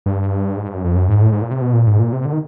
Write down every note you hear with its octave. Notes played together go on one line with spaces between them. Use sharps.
G2
G#2
G2
F#2
F2
F#2
G#2
A2
G#2
A#2
C3
B2
A#2
G#2
A#2
C3
D3
D#3